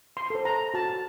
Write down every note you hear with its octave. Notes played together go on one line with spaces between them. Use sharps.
C6
A4 C5
A#5
F#4 A5